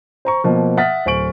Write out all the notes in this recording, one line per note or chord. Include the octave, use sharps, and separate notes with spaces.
C5 A#5 C#6
B2 F3 A#3
E5 F#5 D#6 F6 A6 B6
D1 C5 G#5 C#6 D7 F#7